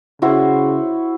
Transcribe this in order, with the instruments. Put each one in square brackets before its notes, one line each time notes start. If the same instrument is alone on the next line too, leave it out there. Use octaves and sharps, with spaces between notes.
[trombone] C#3 [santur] E4 F#4 C5